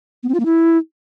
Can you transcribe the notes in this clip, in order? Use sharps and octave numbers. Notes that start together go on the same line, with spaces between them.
B3
C4
F4
A#3
E4